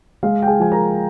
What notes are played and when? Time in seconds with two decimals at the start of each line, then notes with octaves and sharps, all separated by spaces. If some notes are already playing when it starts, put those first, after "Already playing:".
0.23 G#3 F5
0.42 G5
0.47 G#4 G#5
0.60 F3 G#5
0.72 A#4 A#5